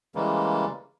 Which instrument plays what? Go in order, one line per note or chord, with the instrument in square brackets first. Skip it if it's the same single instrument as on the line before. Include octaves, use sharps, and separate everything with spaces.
[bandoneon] C#3 E3 G3 G#3 A#3